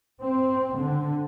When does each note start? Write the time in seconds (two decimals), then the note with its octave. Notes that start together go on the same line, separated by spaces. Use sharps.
0.23 C4
0.76 D3